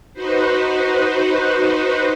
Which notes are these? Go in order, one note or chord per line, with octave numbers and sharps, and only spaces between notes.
D#4 F#4 B4 C5